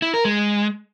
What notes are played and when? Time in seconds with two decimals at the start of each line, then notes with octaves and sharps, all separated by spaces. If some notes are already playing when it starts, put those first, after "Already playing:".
0.02 E4
0.14 A#4
0.25 G#3